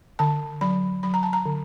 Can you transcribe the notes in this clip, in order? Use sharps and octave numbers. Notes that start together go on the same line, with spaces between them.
D3 A5
F#3 B5
F#3 B5
A#5
A5
A#5
D3